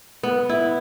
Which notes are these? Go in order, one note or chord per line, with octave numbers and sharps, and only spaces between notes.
B3
E4